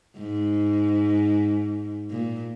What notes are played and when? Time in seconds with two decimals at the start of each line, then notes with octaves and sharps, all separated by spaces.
0.19 G#2
2.11 A#2